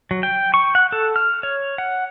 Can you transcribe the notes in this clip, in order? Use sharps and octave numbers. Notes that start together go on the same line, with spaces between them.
F#3
G5
C#6
F#5
A4
F6
C#5
F#5